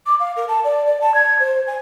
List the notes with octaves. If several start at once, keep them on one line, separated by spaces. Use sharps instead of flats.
D6
F5
A#4
A5
D5
D5
A5
G#6
C5
G#5